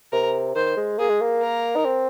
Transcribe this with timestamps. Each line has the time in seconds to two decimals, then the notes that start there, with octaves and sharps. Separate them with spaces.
0.12 C3 A#4
0.56 D#3 C5
0.77 G#3
0.98 A#3 G#4
1.10 G#3
1.21 A#3
1.42 A#4
1.76 D#4
1.85 C4